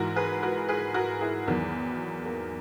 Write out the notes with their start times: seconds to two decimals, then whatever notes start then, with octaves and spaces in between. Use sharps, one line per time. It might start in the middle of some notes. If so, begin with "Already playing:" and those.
Already playing: G#2 E3 F#4 A#4
0.16 G#4 B4
0.42 F#4 A#4
0.69 G#4 B4
0.94 F#4 A#4
1.21 E4 G#4
1.47 E2 D#3 F#3 B3
2.26 A#3